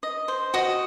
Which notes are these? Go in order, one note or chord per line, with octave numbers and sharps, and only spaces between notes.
D#5
C5
F#4 D#5